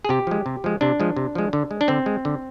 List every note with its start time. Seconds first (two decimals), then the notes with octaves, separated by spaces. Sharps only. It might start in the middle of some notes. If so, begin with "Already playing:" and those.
0.05 G#4
0.09 C3 G4
0.27 F3 G#3
0.46 C3
0.64 F3 G#3
0.81 C3 D4
1.00 F3 G#3
1.16 C3
1.35 F3 G#3
1.53 D3
1.71 G#3
1.81 D4
1.88 D3 C4
2.06 G#3
2.25 D3